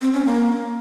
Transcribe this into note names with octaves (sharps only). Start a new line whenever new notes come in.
C4
C#4
A#3